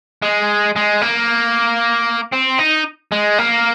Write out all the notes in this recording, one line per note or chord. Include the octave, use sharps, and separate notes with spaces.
G#3
G#3
A#3
C4
D#4
G#3
A#3